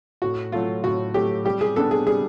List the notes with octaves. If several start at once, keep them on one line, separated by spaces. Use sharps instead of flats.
A2 F#4
F#3 A3 F4
A2 F#4
F#3 A3 G4
G3 G4
G#4
B3 D4 A4
G#4
G3 G#4